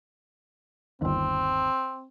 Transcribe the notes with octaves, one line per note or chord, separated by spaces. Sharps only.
G1 D#2 C4